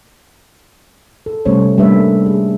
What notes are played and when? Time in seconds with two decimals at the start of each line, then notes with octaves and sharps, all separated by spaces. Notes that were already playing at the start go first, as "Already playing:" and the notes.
1.26 A4
1.46 C3 G3 A3 C#4 C5 C#5
1.78 G3 A3 A#3 D4 B4 E5
2.26 G#4